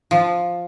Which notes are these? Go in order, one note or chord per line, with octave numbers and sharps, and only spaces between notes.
F3